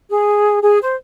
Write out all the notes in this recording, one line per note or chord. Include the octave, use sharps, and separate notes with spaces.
G#4
G#4
C5